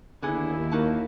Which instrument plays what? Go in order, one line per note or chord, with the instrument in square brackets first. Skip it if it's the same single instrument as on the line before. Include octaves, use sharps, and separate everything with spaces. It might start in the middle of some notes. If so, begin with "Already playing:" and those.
[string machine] D#2 [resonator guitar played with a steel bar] D3 B3 G#4 [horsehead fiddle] E4
[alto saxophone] A#3 [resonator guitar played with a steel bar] D#4 F#4 A5